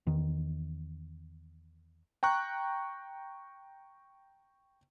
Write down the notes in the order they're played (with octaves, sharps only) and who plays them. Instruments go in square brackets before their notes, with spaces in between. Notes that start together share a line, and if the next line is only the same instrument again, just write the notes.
[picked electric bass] E2 D#3
[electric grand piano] G5 A#5 C#6 F#6